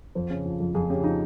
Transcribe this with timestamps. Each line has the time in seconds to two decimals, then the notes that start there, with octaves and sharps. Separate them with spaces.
0.15 F2 C5
0.30 C#3
0.46 F3
0.60 F2
0.75 F2 G#4
0.90 C#3 G4
1.04 F3 D#4